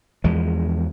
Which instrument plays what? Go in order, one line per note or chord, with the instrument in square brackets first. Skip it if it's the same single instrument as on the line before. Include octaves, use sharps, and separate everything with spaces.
[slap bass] E2 F3 G#3